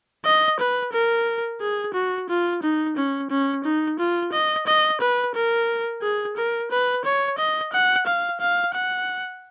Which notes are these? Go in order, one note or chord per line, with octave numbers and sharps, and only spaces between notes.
D#5
B4
A#4
G#4
F#4
F4
D#4
C#4
C#4
D#4
F4
D#5
D#5
B4
A#4
G#4
A#4
B4
C#5
D#5
F#5
F5
F5
F#5